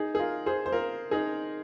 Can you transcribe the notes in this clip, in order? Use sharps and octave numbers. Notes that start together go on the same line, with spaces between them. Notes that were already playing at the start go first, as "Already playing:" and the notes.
Already playing: D#4 G#4
G#4
F4 A#4
G#4 C5
C5
F4 A#4
D#4 G#4